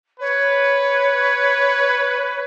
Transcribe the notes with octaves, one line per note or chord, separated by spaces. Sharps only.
B4 C#5